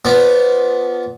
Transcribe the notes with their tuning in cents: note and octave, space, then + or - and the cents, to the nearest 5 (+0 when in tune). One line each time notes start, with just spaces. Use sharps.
F3 +5 B3 +0 D4 -30